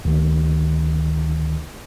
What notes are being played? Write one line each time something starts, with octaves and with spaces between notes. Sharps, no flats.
D2 D#3